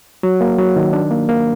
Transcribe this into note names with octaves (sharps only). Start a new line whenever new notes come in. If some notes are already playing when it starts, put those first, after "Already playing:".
F#3
A#3
F#3
D#3
D4
A#3
A#3